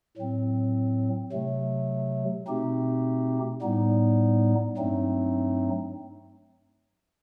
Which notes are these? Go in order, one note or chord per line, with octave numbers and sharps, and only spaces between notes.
A2 F#3 C4
C3 F#3 A3
B2 A3 C4 D#4 G4
A2 G3 B3 D#4
G2 F#3 A3 C4 D#4